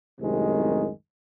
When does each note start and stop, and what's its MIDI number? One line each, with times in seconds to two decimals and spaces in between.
0.20 0.90 36
0.20 0.90 42
0.20 0.90 45
0.20 0.90 48
0.20 0.90 51
0.20 0.90 56